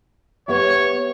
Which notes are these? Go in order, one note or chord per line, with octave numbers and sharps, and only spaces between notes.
B3 G4 C#5 E5